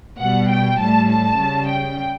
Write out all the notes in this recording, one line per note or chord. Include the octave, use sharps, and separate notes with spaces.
B2 G3 F#5
G5
A2 G3 A5
A5
C#3 G3
G5